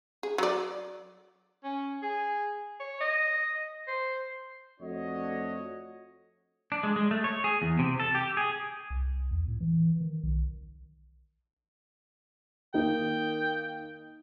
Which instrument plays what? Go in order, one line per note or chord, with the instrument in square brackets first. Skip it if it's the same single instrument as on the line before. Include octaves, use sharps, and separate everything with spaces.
[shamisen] G#4
F#3 D5
[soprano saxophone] C#4
G#4
C#5
D#5
C5
[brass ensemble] F2 A3 D4 F#4 C#5 D#5
[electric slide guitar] D4
G#3
G#3
A3
C#5
G#4
E2
C3
A4
G4
G#4
[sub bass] C2
E2
A2
E3
D#3
B1
[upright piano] D#3 A#3 D#4 [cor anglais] G5